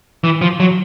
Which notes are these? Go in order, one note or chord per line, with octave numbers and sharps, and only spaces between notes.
E3
F3
F#3